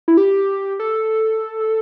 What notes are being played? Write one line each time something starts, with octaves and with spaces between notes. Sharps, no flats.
E4
G4
A4